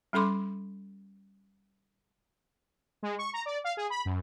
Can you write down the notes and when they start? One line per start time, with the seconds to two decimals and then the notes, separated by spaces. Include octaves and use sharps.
0.13 G3 C#4 A4 B5 C6 D6
3.03 G#3
3.18 C#6
3.33 A#5
3.46 D5
3.64 F5
3.77 G#4
3.90 B5
4.05 F#2